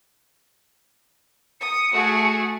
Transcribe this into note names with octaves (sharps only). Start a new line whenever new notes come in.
D#6 C#7
A3 F#4 G#4